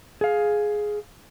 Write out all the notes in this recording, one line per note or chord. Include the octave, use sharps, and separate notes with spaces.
G#4 F5